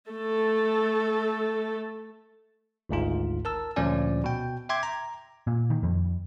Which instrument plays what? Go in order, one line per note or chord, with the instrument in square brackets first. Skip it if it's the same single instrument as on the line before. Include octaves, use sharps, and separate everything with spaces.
[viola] A3 A4
[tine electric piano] G#1 D2 G#2 F4
A#4 A5 E6
D2 A#2 F3 C#4 D5 G#5
B2 G5
E5 G5 C6 D6 G#6
A#5
[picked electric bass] A#2
D#3
F2